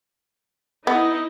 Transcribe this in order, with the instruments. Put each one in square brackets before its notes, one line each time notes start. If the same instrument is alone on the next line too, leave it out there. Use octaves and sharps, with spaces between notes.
[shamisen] B3 [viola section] D#4 E4 D#5